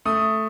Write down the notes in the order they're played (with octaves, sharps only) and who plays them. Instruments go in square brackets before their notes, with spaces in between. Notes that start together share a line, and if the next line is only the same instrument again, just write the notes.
[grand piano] A3 D#6